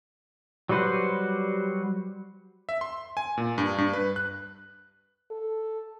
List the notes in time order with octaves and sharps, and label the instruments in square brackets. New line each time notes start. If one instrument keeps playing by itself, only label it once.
[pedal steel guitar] F#3 G3 F#4 B4 C5
[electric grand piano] E5
C6
G#5
A#2
G2
G2
B4
F#6
[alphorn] A4